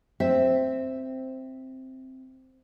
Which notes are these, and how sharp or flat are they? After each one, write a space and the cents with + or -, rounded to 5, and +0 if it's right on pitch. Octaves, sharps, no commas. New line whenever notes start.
C4 +0 E5 +0